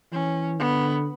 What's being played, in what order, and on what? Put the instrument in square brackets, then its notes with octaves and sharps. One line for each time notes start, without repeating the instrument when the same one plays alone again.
[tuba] E3 [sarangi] C#4
[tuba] D3 [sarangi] B3